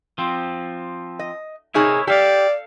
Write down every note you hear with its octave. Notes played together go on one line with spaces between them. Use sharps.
F3 C4
D#5
C3 D#4 E4 G#4 A#4 C#5
G4 A4 D5 F5